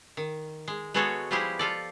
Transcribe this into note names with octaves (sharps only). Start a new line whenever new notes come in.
D#3
G#3
G#3 B3 F#4 G#4 A4 C#5
F3 G3 G#3 E4 G4 G#4
F4 A4 D5